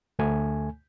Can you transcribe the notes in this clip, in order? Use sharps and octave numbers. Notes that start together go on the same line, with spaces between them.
D2 A3 G#5